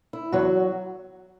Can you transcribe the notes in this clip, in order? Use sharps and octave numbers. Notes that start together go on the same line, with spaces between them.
E4
E2 F#3 F#4